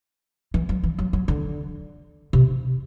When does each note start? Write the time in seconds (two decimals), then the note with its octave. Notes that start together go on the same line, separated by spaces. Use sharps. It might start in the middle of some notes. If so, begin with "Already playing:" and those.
0.54 E3
0.69 F#3
0.83 E3
0.99 F#3
1.13 F#3
1.28 D3
2.33 C3